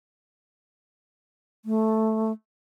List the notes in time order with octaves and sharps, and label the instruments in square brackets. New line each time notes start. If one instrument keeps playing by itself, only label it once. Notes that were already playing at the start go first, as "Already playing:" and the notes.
[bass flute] A3